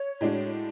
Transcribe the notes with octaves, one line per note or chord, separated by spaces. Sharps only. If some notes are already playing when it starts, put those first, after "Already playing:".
Already playing: C#5
A2 G#3 D4 F#4